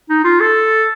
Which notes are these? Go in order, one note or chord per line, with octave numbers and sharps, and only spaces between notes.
D#4
F4
A4